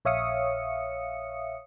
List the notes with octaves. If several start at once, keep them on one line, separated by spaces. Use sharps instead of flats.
A#1 C#5 E5 F5 D#6 C#7